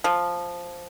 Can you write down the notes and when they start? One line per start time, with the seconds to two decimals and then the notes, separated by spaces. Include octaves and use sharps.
0.04 F3